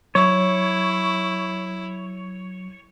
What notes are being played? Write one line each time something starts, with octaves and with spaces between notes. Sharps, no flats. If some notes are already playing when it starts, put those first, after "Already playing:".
F#3 E4 C#5